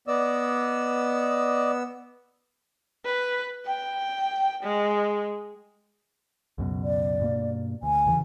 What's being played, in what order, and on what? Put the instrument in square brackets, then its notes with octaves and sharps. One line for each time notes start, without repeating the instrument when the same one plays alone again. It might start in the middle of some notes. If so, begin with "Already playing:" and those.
[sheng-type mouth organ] B3 E6 [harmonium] D5 D#5
[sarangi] B4
G5
G#3
[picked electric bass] C#2 F#2 B2
[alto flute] D5
[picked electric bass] G2 B2 A#3
[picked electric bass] D2 [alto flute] G#5
[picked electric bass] E2 C#3 E3